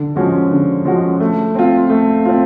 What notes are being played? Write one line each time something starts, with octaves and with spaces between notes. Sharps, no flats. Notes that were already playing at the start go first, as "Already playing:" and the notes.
Already playing: D3
F3 G#3 C#4 F#4
D3
F3 G#3 C#4 F#4
A3
C4 F4
A3
C4 F4